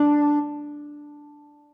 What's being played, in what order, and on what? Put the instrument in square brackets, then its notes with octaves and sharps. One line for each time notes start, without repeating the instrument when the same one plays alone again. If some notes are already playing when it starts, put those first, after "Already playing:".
Already playing: [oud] D4